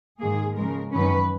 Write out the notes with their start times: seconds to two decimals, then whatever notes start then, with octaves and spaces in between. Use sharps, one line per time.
0.19 G#2 D#3 A#3 G#4
0.56 C#3 F3 G#3 A#4
0.92 F#2 D#3 F#3 C#4 B4